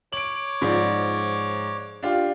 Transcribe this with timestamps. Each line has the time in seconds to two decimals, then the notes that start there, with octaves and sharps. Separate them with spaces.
0.13 C#5 D6 D7 F#7
0.61 G#2 F3 D5
2.03 D4 F4 G4